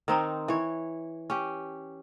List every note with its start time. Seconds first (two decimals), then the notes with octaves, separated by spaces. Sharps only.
0.08 D#3 C4 D#4
0.48 E3 C#5
1.30 C#4 G4